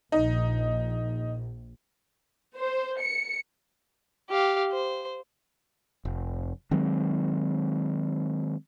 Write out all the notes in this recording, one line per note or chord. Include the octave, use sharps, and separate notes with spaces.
A#1 D#4
C5
C#7
G4 F5
C5
F1
D#3 F#3 G#3 C4